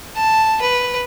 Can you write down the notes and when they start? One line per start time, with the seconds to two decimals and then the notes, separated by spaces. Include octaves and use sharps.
0.16 A5
0.62 B4